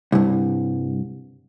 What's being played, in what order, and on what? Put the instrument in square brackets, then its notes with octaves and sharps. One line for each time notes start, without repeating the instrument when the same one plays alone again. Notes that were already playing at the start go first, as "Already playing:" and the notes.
[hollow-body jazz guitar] C2 G2